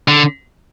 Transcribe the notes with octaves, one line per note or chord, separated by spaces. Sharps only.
D3